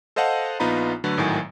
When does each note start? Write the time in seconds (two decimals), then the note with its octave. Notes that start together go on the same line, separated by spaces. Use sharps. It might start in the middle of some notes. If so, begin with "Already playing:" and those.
0.16 A4 C5 D#5 F5 F#5 A5
0.60 A#1 B3 D#4 F4 A#5 B5
1.04 D3 F#3 A3 B4
1.18 G#1 A2 D#3 F#3 G#5